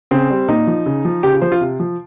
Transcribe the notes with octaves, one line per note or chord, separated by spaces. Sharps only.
C#3 C4
G3
A#2 D#4
F3
C#3
F3
C#3 G4
F4
F3 C5
F4
C3
F3